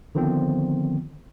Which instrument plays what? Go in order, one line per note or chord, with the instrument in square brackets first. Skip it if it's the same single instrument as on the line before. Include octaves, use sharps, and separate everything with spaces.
[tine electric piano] D3 D#3 F3 B3 C4